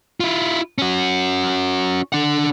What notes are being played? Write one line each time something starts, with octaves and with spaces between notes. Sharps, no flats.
E4 F4
C#4 F#4
D4 F#5